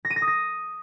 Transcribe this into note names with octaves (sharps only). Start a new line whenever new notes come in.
A#6
D#7
A#6
D#6
A#6